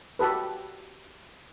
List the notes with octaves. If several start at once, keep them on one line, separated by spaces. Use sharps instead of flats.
F#4 G4 A4 B4